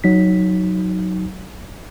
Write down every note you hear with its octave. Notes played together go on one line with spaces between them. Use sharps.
F#3 D#4 B6